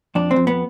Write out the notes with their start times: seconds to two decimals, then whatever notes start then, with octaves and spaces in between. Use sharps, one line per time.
0.15 F2 D4
0.31 C4
0.36 F2
0.47 B3